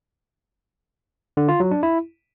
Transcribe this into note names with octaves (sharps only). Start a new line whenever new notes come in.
D3
F4
F#3
D4
E4